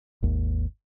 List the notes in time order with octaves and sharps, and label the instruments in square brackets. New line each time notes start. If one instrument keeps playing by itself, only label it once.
[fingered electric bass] G#1 D#2